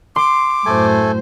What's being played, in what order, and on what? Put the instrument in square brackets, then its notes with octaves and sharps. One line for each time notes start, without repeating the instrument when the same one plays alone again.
[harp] C6 [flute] D6
[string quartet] F#2 A2 C5 [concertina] A3 A4 G#5